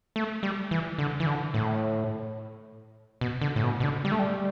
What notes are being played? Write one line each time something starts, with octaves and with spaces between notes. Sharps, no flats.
A3
G3
E3
D3
E3
D3
A2
B2
D3
A2
B2
B2
D3
G3
A3
G3